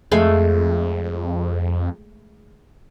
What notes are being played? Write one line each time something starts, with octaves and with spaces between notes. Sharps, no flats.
F2 G#3 A3 F5